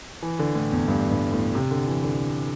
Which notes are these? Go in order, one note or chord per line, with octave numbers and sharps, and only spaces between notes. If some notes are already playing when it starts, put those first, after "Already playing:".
E3
D3
A2
E2
G2
G2
A2
C3
D3
E3
D3